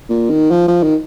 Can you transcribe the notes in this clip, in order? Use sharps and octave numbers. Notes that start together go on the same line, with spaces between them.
A#2
D#3
F3
F3
D#3